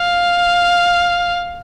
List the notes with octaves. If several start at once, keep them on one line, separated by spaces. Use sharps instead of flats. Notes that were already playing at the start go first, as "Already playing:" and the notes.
Already playing: F5